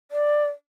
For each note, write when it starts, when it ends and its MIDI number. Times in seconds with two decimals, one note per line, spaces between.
0.11 0.45 74